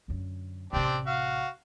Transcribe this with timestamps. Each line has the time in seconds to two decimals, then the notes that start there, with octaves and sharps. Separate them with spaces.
0.08 F#2 D3
0.73 A1 C3 C4 D4 G4
1.07 F#4 F5